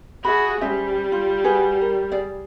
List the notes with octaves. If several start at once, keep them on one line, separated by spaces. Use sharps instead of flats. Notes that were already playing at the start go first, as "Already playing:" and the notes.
F#4 G#4 E5 B5
G3 C#4 C5 E5
F4
F#4 G#4 B4
A#4
G#4 D5